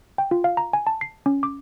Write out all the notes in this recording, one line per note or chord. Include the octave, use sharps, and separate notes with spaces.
G5
F4
F5
A#5
G#5
A5
C7
C#4
D6